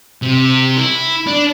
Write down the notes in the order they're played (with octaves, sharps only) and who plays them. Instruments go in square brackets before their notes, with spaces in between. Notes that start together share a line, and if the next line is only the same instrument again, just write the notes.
[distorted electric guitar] C3
E4
D4